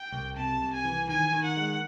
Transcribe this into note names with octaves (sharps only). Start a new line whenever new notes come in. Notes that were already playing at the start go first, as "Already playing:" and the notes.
Already playing: G5
C2
C3 A5
C2
G#5
E3
D#3 G#5
D#3
F#5
G#3